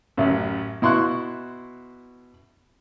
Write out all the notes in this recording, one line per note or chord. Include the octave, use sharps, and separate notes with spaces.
A1 F#2
B2 E4 C6 C#6 F#6